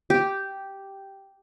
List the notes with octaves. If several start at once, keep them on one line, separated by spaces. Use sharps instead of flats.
G4